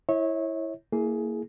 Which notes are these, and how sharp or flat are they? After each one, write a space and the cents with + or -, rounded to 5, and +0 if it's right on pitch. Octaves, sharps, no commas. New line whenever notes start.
E4 +0 C#5 -20 E5 -40
A#3 -15 E4 +0 G#4 +15